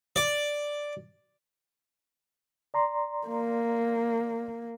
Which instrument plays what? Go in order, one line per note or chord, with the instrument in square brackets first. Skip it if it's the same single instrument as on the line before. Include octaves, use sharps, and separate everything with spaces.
[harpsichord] D5
[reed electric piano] D5 A#5 C6
[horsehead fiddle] A#3